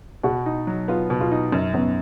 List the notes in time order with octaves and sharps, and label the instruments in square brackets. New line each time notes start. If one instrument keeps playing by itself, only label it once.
[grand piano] B2 [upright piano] F#4
[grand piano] D#4
F#3
[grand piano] B3 [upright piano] F4
[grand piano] B2
[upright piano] F4
[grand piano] D#4
[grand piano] F#2 [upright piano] C#4
[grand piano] F#2 [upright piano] B3